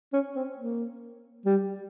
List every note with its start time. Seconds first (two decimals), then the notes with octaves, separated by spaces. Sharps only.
0.13 C#4
0.36 C4
0.58 A#3
1.45 G3